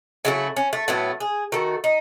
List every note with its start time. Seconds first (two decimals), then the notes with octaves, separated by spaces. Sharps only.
0.25 C#3 F#3 A3 E4
0.57 C#4
0.73 A3
0.88 A2 F#3 A3 B3
1.20 G#4
1.52 D#3 A3 F#4
1.84 D#4